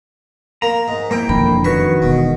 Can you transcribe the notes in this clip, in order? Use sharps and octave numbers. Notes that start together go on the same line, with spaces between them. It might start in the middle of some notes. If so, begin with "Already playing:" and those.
A#3 A#5
G#2
A#3 E4 A#4 G5
E1 F2 D3 B5
D#3 F#4 B4 C#5
E1 B2